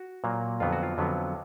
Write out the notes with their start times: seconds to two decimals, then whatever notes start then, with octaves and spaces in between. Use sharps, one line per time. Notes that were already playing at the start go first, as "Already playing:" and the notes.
Already playing: F#4
0.24 A#2 F#3 A#3
0.60 F2 D3 F#3 B3 F4
0.72 F#4
0.83 F4
0.98 F2 D3 F#3 B3